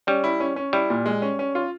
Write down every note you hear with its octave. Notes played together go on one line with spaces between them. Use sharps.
G3 C#4
E4
C#4
C#4
G3 E4
A#2
G#3
C#4
C#4
F4